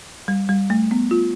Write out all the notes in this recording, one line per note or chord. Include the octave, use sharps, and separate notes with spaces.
G3
G3
A3
B3
F4